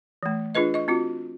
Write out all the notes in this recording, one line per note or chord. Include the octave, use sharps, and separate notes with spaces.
E3 A3
D4 F4 G#4 B4 D#5
D#5 C#6
C4 F4 F#4